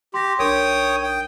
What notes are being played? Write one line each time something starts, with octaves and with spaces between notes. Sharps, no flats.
G4 C6 A#6
B1 D4 A#4 C#5 G5 D#6
G5